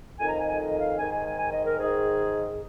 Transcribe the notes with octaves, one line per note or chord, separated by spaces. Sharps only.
F2 D#3 G#5
A#5
G#5
G#5
D#5
F5
G#2 D#3 G#5
G#5
G#5
G#5
D#5
A#4
G#2 D#3 G#4